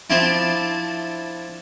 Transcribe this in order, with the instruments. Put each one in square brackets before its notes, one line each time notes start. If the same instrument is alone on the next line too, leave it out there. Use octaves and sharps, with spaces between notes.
[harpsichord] F3 C4 D4 E4